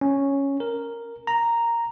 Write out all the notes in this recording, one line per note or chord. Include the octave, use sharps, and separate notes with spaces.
C#4
A#4
A#5